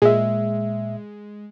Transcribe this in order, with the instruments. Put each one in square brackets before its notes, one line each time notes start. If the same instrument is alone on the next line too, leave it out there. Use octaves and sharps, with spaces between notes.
[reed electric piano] A#2 E5 [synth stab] G#3